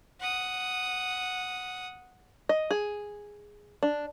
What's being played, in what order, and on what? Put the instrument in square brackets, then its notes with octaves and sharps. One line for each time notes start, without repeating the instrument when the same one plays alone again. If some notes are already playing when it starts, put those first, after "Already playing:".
[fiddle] F#5 D#6
[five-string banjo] D#5
G#4
D4